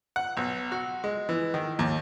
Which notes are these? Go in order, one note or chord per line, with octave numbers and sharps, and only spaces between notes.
F#5
B1
F#4
G#3
E3
D#3
D#2